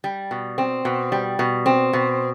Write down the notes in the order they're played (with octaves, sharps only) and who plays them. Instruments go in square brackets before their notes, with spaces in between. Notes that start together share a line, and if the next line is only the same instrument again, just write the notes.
[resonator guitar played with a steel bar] G3
B2
C4
B2
G3
B2
C4
B2